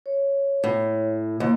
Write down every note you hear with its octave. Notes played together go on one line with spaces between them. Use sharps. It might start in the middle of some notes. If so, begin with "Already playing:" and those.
C#5
A2
D#2 A#3